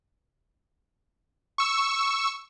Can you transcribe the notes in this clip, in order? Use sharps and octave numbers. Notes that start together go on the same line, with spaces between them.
C#6 E6